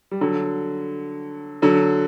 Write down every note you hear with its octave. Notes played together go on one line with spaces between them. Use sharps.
G3
D3 F#3
D3 F#3